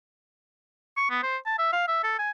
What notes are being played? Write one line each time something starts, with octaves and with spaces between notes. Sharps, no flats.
C#6
B3
C5
A5
E5
F5
E5
A4
G#5